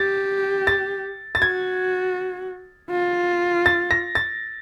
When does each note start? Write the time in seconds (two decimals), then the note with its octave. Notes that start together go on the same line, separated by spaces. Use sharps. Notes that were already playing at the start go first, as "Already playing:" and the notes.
Already playing: G4 A6
0.67 A6
1.35 A6
1.42 F#4 G#6
2.91 F4
3.66 A6
3.91 A#6
4.15 A6